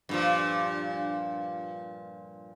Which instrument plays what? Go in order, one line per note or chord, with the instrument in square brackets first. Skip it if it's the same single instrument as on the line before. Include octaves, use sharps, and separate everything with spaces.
[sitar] G2 A#2 F3